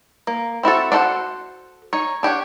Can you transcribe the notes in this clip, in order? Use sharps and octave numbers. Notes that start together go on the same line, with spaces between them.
A#3
C4 E4 F#4 A4
D4 F#4 A4 C5 F#5
D#4 C#5
D4 G4 C#5 F#5